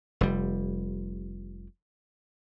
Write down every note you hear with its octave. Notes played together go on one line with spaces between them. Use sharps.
F1 G3